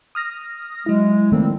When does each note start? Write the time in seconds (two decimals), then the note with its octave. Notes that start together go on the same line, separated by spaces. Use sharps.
0.15 D#6 F6 A#6
0.86 F#3 G#3 E4
1.32 D#3 F3 G3 A3 A#3 C4